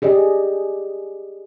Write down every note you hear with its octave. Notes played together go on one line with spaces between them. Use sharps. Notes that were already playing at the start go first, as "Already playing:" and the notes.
G4 G#4 D5 D#5